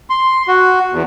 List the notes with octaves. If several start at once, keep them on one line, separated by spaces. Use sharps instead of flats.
C6
F#4
E2